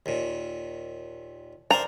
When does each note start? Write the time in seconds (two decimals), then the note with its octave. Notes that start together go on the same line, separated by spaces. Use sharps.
0.06 D#2 A#2
1.71 A#4 C5 D5 A#5